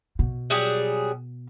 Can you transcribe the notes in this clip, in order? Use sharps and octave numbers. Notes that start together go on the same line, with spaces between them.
B2
F#3 G3 G#4